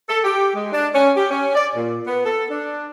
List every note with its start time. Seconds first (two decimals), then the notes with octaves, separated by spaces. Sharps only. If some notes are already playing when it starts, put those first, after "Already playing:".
0.09 A4
0.24 G4
0.55 G#3
0.73 D4
0.94 C#4
1.16 G4
1.31 C#4
1.55 D5
1.76 A#2
2.06 B3
2.25 A4
2.51 D4